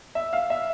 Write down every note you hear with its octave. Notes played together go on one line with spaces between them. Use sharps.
E5
F5
E5